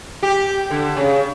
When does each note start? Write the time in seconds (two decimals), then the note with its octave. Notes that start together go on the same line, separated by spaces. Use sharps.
0.23 G4
0.70 D3
0.97 C#3